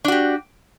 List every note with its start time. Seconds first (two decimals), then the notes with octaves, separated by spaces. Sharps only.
0.05 D4
0.08 F#4
0.12 G4